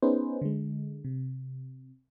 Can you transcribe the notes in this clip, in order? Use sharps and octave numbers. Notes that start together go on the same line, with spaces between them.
B3 C#4 D#4 G#4 B4 C5
D3 G#3
C3